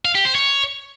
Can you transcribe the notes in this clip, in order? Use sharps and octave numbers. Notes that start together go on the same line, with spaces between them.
F5
G4
C5
C#5